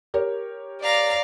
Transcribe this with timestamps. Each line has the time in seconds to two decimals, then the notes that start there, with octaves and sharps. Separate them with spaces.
0.14 G4 A#4 C#5
0.82 D5 F5 A#5